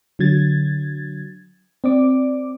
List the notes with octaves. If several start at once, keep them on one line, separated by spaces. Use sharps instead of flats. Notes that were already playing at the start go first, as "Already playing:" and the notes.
D3 F#3 G#6 A6
C4 D5 D6